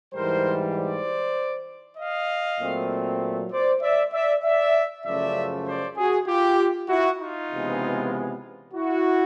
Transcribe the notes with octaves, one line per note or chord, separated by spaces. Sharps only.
G#2 E3 G3 A#4 C5
C5 D5
D#5 F5
A#2 F#3 A3 C4
C5 D5
D5 E5
D5 E5
D5 E5
F#2 C#3 F3 A3 D5 E5
C5 D5
F#4 G#4
F4 G4
E4 F#4
D#4 F4
C#2 C3 E3 G#3 B3
E4 F#4